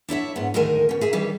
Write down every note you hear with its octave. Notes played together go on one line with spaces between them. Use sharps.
D4 E4 C#5 E5
G#2 B3
D2 A2 D#3 G#3 A#4 G#5
B2 C#4
G#4 E5 G#5
D#3 E3 G3 C#4